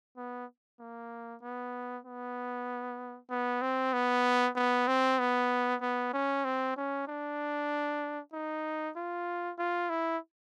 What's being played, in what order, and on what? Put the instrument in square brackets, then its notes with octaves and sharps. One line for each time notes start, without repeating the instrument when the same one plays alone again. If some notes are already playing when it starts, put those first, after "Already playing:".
[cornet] B3
A#3
B3
B3
B3
C4
B3
B3
C4
B3
B3
C#4
C4
C#4
D4
D#4
F4
F4
E4